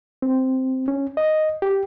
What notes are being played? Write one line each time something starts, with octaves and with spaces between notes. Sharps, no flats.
C4
C#4
D#5
G4